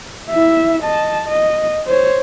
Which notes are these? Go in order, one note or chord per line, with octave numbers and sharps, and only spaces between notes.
E4 E5
D#5 A5
D#5
C5 C#5